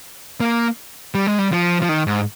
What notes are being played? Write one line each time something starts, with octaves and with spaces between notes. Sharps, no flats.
A#3
G3
G#3
G3
F3
F3
D#3
G#2